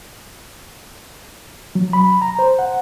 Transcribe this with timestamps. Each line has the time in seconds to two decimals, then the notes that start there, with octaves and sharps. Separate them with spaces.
1.75 F#3
1.93 B5
2.22 A#5
2.39 C5
2.59 F#5